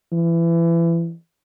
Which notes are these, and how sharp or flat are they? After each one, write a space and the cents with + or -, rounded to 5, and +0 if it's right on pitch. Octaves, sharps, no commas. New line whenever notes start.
E3 +25